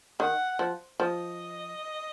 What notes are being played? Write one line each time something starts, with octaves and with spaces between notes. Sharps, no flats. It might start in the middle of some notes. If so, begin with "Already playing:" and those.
D#3 F#5
F3
F3 D#5